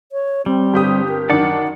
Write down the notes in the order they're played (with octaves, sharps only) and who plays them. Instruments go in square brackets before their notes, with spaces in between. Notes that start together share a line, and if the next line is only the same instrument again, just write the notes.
[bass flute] C#5
[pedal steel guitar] G3 [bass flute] C4
[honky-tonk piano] G1 G4 D#6
[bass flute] A#4
[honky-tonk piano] F#2 D#3 D4 [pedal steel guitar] D5 F#5 D6